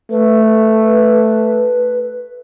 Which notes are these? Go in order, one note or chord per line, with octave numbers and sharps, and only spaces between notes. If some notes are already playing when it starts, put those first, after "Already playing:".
A3 B4